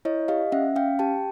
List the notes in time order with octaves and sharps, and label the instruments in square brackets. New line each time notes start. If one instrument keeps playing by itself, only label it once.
[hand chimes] E4 C#5 D#5
G4 D#5 F5
C#4 E5 F#5
C#4 F5 G5
G4 G5 A5